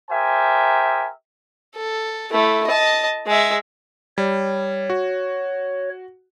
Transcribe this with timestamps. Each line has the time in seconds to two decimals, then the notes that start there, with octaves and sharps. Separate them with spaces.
0.10 G4 A#4 C5 E5 G#5
1.76 A4
2.32 A3 E4
2.67 D#5 A5
3.27 G#3 E5
4.18 G3 C#5
4.90 F#4